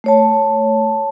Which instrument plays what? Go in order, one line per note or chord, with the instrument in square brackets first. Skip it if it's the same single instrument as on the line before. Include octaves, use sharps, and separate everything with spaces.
[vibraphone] A3 C#5 A5